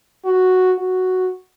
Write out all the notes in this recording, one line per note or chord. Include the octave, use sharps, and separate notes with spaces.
F#4
F#4